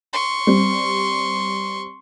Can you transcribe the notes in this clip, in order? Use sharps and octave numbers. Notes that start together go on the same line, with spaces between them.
C6 C#6
G3 C4